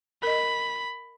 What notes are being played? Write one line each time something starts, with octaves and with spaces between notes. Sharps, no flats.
A#4 D#5 B5